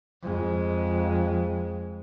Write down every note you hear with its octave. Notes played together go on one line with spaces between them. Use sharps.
F2 G#3